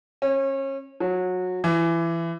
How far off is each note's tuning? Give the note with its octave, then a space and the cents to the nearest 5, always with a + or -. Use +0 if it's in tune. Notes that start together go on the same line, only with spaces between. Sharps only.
C#4 -30
F#3 -20
E3 +20